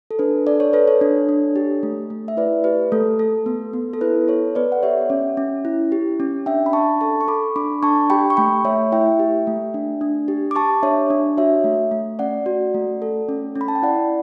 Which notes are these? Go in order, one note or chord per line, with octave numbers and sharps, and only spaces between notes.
A4
D4 B4
A4 D5
C#5
A4 B4
A4 C#5
D4
D4
G4
A3
A3
E5
E4 B4 D5
G4 B4
A3 A4
A4
B3
B3
A4
E4 B4
A4 C#5
B3 B4 D5
F#5
G4 C#5 E5
C#4
C#4
E4
G4
C#4
D4 E5 G5
B5
D4 A5 C#6
A4 A5 C#6
C#6
A4 B5 D6
D4 B5 D6
D4 A5 C#6
G4 G5 B5
C#6
A3 G5 B5
A3 C#5 E5
E4 E5 G5
G4
A3
D4
D4
G4
D6
G4 A5 C#6
D4 C#5 E5
D4
F#4 C#5 E5
A3
A3
C#4 D5 F#5
F#4
A3
A4
C#4
C#4
B5
A5
G5
E4 D5 F#5